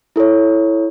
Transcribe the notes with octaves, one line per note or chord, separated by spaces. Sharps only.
E4 A4 C#5